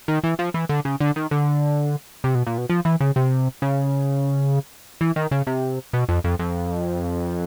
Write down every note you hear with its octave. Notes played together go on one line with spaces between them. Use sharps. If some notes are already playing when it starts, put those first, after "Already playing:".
D#3
E3
F3
E3
D3
C#3
D3
D#3
D3
C3
B2
A#2
B2
F3
E3
C#3
C3
C#3
E3
D#3
C#3
C3
B2
F2
F2
F2